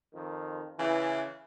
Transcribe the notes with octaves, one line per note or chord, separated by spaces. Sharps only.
F2 D#3
C#3 E3